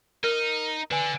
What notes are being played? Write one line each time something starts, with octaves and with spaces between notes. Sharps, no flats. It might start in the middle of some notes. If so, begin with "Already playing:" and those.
D#4 A#4 F6
D3 B4 G#5